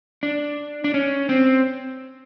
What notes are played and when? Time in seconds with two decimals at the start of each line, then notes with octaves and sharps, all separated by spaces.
0.23 D4
0.84 D4
0.94 C#4
1.29 C4